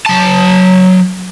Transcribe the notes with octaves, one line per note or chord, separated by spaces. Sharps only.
F#3 A5